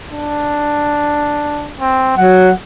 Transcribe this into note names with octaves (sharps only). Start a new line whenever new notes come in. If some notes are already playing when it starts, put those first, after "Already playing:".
D4
C4
F#3 F#5